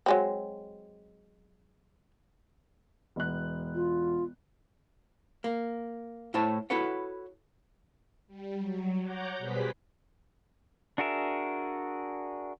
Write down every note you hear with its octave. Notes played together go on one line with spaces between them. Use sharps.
F#3 G#3 C4
E1 B3 F#6
F4
A#3
A2 E4 C5 C#5 A5
E4 F#4 A4 B4 C#5 F#5
G3
F#3
C#5 F#5 A#5 D6 G6
B2 G3 G#4 B4 C5 B6
D4 F#4 G#4 A#4 E5